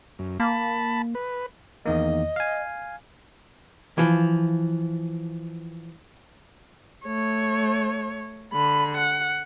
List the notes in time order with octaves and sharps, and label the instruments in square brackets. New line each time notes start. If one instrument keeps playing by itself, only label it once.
[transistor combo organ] F#2
[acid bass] A#3 [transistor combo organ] A5 B5
[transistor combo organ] B4
[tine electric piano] E2 D#3 A#3 [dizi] D#5
[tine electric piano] F5 G#5
[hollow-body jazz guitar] E3 F3
[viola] A3 C#5
D3 B5
F#5